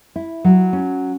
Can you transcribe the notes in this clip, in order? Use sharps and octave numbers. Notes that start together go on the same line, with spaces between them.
E4
F#3
C#4